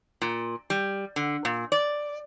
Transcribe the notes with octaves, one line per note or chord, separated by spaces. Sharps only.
A#2
G3
D3
A#2
D5